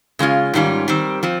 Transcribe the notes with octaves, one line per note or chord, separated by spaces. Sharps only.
C#3 G#3 C#4 F4
G#2 D#3 G3 C#4 F4
D#3 G3 C4
F3 C4